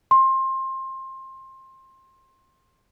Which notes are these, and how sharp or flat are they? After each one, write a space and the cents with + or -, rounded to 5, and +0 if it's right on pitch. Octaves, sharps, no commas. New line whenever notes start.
C6 +25